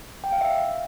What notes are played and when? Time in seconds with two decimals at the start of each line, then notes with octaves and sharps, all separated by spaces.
0.24 G5
0.32 F5
0.41 E5